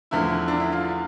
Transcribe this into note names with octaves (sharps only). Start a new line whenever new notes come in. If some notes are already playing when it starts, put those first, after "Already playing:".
E2 D3 F3 A3 E4
D4
E4
F4